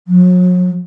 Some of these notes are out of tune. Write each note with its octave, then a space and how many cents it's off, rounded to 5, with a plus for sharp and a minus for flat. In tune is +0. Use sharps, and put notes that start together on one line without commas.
F#3 -40